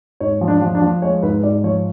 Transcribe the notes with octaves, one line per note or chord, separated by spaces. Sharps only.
G#2 C#5
F3
D4
F3
D4
F3
G#3 C#5
G#2 B4
G#2 D5
F3 C#5